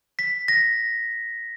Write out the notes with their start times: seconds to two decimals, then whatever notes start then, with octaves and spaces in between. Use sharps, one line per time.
0.19 B6
0.48 A#6